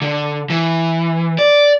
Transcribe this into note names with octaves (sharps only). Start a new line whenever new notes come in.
D3
E3
D5